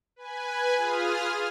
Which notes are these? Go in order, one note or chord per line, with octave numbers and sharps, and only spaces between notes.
B4 G#5
F4 G#4 D#6 F6